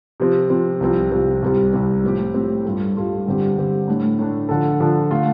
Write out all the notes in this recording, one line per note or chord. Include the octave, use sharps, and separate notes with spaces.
C3 F3 C4
C3 F3 C4
C2 C3 F3 C4
C2 C3 F3 C4
C2 C3 G3 C4
C2 C3 G3 C4
A2 F3 C4 G4
A2 F3 C4 G4
G2 G3 F4 A4
G2 G3 F4 A4
G2 D3 G3 C4 G4
G2 D3 G3 C4 G4
A2 A3 D4
A2 A3 D4
D3 F3 D4 A4
D3 F3 D4 A4
D3 A3 F4